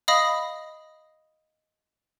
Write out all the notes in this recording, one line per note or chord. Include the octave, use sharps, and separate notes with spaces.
D#5 F5 B5 D#6 A#6